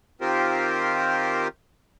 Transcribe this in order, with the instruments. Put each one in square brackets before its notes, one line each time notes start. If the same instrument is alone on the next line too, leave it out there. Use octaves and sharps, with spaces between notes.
[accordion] D#3 C4 F4 G4 A#4 C5